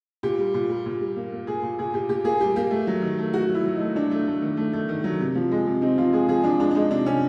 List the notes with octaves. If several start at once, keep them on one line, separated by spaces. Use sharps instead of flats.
A#2 G4
G3
A#2
G3
A#2
G3
A#3
A#3
A#2 G#4
A#2
A#2 G#4
A#2 G4
A#2 G4
A#3 G#4
G3 G4
A#3 G4
A3
F#3
D#3
A3
D#3 F#4
F#3 E4
F#3
A3 D#4
F#3 D4
A3
A3
D#3
A3
A3
D#3
F#3
C3
F3
G#3
C3
C4 D#4
F3 F4
G#3 G#4
F3 G#4
F3 D4
G#3 D4
D4
G#3 D#4
C3 D4
C3 C#4